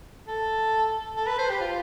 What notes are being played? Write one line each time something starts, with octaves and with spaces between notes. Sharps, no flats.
A4
A4
B4
C5
G4
F4